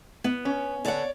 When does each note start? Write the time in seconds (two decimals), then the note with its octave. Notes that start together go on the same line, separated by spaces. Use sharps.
0.24 B3
0.45 C#4
0.85 D3 C#5 D5 F#5